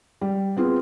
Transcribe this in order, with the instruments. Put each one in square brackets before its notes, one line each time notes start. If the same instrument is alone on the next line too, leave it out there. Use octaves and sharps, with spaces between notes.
[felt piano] G3
B3 C4 F4 G#4